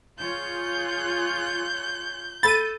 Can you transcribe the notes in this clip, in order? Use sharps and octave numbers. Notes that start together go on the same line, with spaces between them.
F4 G#4 C#5 G6
A4 B5 A6 D#7